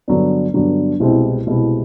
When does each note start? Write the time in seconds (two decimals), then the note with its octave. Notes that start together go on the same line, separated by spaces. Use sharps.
0.08 G2 D3 F#3 B3 D4
0.54 G2 D3 F#3 B3 D4
1.00 C2 B2 G#3 C4 E4
1.47 C2 B2 G#3 C4 E4